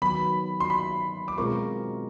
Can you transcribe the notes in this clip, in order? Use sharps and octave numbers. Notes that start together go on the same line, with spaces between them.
D#3 F#3 B3 B5
C6
B5
D6
B2 G#3 C4 F4 A#4 C#6